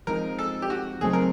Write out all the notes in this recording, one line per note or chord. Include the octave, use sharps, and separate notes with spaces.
F3 G#3 C4 D#4 A#4
A4
G4
F#4
C#3 F#3 A3 C4 D#4 G#4
A#4